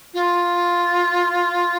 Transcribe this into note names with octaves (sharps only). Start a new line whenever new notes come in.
F4